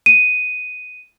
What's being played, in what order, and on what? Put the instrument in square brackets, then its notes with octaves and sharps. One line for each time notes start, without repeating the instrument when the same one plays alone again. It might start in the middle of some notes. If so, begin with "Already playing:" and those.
[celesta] D#7